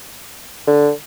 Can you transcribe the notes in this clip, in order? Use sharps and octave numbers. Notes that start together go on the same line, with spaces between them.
D3